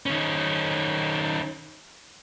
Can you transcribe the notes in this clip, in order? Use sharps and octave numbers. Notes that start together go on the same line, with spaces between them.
D#3 C#4